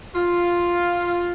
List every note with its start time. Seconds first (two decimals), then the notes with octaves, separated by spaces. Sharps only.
0.15 F4